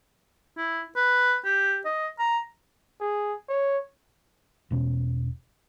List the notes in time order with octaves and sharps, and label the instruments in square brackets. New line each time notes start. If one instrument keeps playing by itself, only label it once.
[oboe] E4
B4
G4
D#5
A#5
[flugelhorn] G#4
C#5
[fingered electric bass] E1 B2 C#4